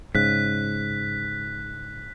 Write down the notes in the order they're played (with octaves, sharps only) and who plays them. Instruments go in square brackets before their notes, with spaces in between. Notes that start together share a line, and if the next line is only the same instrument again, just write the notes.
[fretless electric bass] G#2 C#3 [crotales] F#6 B6